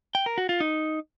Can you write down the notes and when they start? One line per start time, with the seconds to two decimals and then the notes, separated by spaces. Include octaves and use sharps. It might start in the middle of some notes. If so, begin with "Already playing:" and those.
0.15 G5
0.26 A#4
0.38 F#4
0.49 F4
0.60 D#4